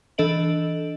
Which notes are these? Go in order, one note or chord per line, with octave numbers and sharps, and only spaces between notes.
E3 D4 A4 D#5 D7 F#7